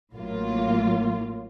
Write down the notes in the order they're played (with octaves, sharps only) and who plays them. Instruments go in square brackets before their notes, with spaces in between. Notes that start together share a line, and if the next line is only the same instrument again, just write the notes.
[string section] A1 A2 F#3 A#3 F4